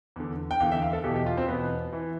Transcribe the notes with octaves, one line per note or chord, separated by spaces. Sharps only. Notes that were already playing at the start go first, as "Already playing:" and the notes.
E2 D3
G5
E2 D3 F5
E5
F5
A4
E2 B2 G4
G4
F4
C4
E2 B2 B3
E3